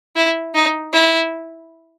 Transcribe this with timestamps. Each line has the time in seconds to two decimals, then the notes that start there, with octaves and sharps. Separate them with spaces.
0.16 E4
0.54 D#4
0.93 E4